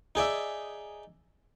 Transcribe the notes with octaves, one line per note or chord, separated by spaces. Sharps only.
D#4 G#4 D5 E5